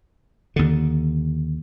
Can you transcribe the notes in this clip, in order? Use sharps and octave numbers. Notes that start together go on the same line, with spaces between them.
D#2 D3